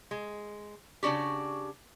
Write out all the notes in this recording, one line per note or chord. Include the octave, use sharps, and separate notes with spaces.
G#3
C#3 C4 D4 F#4 G4